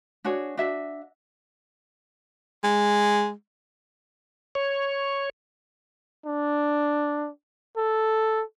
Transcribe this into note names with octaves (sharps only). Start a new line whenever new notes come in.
D4 F#4 G#4 C#5
D4 F#4 E5
G#3
C#5
D4
A4